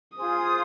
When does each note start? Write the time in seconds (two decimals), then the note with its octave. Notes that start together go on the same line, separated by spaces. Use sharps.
0.16 F4 G#4 C5 D#6